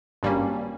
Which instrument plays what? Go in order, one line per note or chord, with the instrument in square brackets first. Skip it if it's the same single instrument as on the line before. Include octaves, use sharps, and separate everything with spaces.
[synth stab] G#1 G2 G3 A#3 C#4